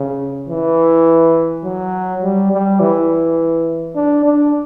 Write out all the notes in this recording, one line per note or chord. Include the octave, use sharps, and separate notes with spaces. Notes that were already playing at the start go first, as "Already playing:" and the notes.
Already playing: C#3
E3
F#3
G3
G3
E3
D4
D4